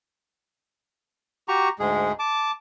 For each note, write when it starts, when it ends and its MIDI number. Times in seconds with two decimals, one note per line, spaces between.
1.48 1.69 66
1.48 1.69 67
1.48 1.69 82
1.48 1.69 85
1.79 2.12 38
1.79 2.12 44
1.79 2.12 56
1.79 2.12 68
2.19 2.51 81
2.19 2.51 86